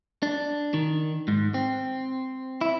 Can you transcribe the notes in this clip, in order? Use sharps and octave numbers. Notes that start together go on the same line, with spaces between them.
D4
D#3
G#2
C4
E4